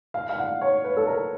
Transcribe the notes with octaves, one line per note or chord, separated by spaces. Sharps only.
F5
F5
F#5
C#5
B4
A4
A#4